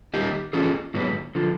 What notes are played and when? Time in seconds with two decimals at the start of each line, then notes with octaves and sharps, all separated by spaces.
0.14 D#3 G3 A#3 D#4 G4
0.53 E3 A3 C#4 F4 G#4
0.94 G#2 D#3 F#3 B3
1.35 D3 F3